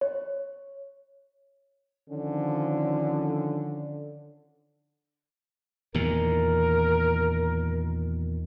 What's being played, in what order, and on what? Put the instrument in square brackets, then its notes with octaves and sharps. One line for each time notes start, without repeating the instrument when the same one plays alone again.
[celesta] C#5
[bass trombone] D3 [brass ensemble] D#3 F3 C#4
[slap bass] E2 A#2 D#3 [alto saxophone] A#4